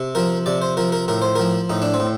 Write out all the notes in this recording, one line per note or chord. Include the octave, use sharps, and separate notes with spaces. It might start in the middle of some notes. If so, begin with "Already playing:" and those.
Already playing: C3
F3 A#4
C3 D5
C5
F3 A#4
A#4
A2 A#4
C5
F3 A#4
A2 D#4
D4
C4
A2